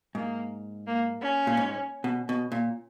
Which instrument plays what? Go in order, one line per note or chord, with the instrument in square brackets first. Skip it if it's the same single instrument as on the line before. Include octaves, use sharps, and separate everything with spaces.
[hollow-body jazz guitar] G#2 [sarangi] A#3
[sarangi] A#3
C#4
[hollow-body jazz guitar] A#2
G#2
B2
B2
A#2